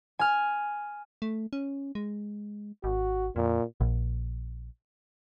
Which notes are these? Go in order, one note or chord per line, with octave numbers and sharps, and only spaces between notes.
G#5 F6
A3
C#4
G#3
G#1 F#4
F2 A#2
A#1